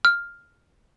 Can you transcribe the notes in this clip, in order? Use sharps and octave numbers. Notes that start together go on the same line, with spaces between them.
F6